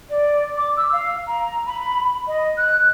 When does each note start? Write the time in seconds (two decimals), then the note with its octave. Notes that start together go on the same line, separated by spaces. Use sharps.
0.10 D5
0.57 D6
0.77 E6
0.93 F5
1.28 A#5
1.67 B5
2.27 D#5
2.58 F#6